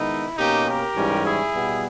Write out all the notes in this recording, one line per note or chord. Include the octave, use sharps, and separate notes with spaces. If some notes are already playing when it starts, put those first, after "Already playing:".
Already playing: D#3 G#3 B3 D#4 E4
B2 A#3 C#4 D#4 G4
G4 A#4
G#2 E3 G3 C#4
E4 G#4
B2 G3 B3